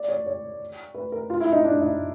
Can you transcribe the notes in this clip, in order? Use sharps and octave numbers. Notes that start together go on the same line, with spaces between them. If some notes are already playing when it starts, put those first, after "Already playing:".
Already playing: D5
C#5
C#5
B4
A#4
F4
E4
D#4
D4
D#4